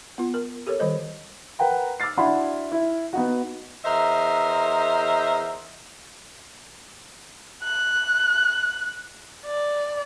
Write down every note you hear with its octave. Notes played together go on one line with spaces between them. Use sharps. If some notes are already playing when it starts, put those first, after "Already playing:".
B3 F4
A#4
G4 A4 A#4 C#5
D#3 G3 C5 D#5
A#4 B4 F#5 G5 A#5
D6 E6 F6 A6 C7
D4 E4 F#4 F#5 B5 C6
E4
B3 D#4 F#4
E2 A#4 C5 D#5 E5
F#6
D5